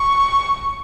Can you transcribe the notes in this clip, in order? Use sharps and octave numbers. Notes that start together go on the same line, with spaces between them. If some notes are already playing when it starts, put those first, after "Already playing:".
Already playing: C#6